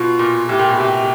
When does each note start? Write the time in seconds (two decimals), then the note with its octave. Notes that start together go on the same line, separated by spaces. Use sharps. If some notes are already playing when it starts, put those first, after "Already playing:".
Already playing: B2 F4
0.19 A#2
0.49 A2 G4
0.59 A#2
0.69 B2
0.79 C3 G4